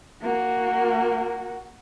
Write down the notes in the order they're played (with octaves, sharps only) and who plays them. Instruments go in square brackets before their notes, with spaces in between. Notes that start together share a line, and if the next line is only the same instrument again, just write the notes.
[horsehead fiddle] A#3 F#4